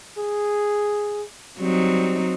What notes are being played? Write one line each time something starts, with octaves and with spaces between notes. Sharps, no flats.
G#4
F#3 G3 C4 D#4